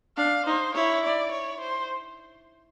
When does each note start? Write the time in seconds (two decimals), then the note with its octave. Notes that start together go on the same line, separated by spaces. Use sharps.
0.17 D4 F5
0.46 D#4 C5
0.75 E4 C#5
1.03 D5
1.32 C#5
1.60 C5